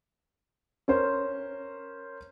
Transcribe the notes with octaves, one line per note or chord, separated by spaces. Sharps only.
C#4 A#4 C5